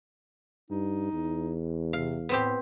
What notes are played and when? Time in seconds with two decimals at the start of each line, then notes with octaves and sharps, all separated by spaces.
0.70 G2 D#4
1.13 E2
1.93 C3 F5
2.29 A2 B3 C4 G4